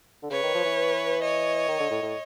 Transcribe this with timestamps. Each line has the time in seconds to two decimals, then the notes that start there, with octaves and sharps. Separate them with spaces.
0.23 D3
0.30 C#3 B4 C#5
0.43 D#3
0.54 F3
0.65 E3
1.22 C#5 D#5
1.68 D#3
1.80 D3
1.91 A2
2.02 A2